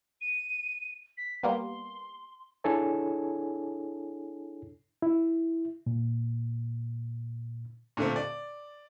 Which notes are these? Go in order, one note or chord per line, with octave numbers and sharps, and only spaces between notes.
D#7
B6
G3 A#3 B3 C6
D4 E4 G#4 A4 C#5 G#5
E4
A#2
A#2 D3 A3 C4
D5